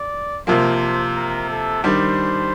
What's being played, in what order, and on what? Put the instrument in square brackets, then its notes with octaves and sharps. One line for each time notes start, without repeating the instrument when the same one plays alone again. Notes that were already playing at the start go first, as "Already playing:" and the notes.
Already playing: [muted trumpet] D5
[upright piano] C3 F3 A#3 [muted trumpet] C5
[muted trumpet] A#4
A4
[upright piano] D#3 G3 D4 [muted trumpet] C5